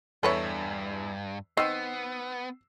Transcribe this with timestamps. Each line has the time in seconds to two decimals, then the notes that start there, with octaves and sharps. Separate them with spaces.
0.23 E2 G2 A4 B4 C#5 E5
1.57 D#3 B3 C4 E6 C7